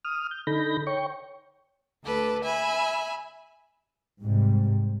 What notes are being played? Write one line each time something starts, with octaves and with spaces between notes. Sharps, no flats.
D#6 F6
G6
D3 D#4 A4 B5 G6 A#6
C#5 G5 C#6
D2 A4 B4 D6
E5 G#5 B5
G#2 C3 G3